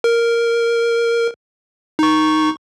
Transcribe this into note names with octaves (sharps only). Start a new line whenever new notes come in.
A#4
D#4 C#6